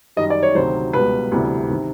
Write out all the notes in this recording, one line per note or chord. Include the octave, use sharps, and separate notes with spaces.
F#2 D#3 G3 D#5
D5
C#5
D2 C3 D#3 F#3 C5
C#2 B2 G3 B4
D2 C3 E3 G3
C3 D#3